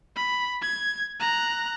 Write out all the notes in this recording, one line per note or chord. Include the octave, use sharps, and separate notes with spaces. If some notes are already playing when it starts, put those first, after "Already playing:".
B5
G#6
A#5 F#6